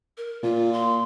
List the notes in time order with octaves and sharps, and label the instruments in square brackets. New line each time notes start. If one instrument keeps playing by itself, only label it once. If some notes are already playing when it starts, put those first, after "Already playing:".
[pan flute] A#4
[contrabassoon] A#2 [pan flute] F4
[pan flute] C6